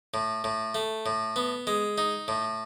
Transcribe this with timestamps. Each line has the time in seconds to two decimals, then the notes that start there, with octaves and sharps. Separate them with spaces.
0.14 A2
0.44 A2
0.75 A3
1.06 A2
1.36 B3
1.67 G#3
1.98 D#4
2.28 A2